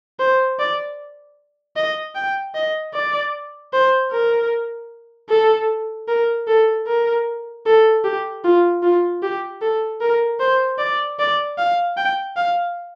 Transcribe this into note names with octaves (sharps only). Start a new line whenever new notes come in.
C5
D5
D#5
G5
D#5
D5
C5
A#4
A4
A#4
A4
A#4
A4
G4
F4
F4
G4
A4
A#4
C5
D5
D5
F5
G5
F5